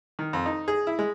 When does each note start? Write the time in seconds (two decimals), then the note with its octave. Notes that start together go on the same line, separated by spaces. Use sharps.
0.19 D#3
0.33 F2
0.46 D#4
0.68 G#4
0.87 E4
0.99 G#3